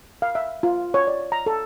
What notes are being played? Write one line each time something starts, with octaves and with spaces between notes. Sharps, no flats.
F5
E5
F4
C#5
D5
A#5
A4